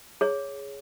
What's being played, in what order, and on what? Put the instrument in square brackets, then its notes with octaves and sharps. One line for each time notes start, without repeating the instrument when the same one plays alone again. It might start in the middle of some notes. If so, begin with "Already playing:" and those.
[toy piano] G#4 C#5